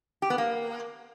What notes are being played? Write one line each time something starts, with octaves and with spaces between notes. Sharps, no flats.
G4
B3
A#3